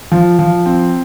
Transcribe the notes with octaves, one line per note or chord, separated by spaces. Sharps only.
F3
F3
C4